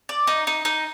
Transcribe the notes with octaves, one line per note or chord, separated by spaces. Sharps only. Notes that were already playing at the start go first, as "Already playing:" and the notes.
D5
D#4
D#4
D#4